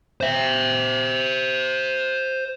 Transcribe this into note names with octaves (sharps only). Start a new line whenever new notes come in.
C5 E5